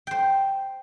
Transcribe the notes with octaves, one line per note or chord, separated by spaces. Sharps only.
C5 G5